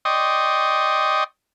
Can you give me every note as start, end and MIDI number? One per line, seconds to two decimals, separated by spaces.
0.05 1.24 74
0.05 1.24 75
0.05 1.24 79
0.05 1.24 84
0.05 1.24 85
0.05 1.24 87